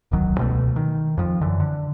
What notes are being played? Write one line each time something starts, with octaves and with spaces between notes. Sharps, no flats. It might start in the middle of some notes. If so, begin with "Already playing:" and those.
D1 B1 D#3 F#3
C#2 B2 G3 A3
D#3
F2 F3
F#2 D3 E3
D3